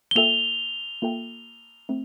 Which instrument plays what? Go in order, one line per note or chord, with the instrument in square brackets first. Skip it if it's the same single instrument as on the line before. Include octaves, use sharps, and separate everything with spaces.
[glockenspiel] G7
[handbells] A#3 F4 A4 E5 G5 [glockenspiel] F7
[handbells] A#3 F4 A4 E5 G5
A3 C4